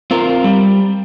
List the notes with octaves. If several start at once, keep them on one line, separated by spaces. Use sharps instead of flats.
C4 F4 A#4
G3